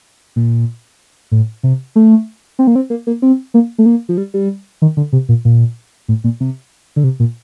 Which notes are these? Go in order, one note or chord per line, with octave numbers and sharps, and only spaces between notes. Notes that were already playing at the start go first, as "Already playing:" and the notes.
A#2
A2
C3
A3
C4
A#3
C4
A#3
A#3
C4
A#3
A3
A#3
F3
G3
G3
D#3
D3
C3
A#2
A#2
A2
A#2
C3
D3
C3
A#2